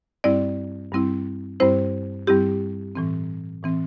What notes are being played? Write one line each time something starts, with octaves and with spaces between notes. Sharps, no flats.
G2 G3 C4 E4 D5
G2 G3 C4 E4
G2 G3 C4 E4 C5
G2 G3 C4 E4 G4
A2 E3 C4
A2 E3 C4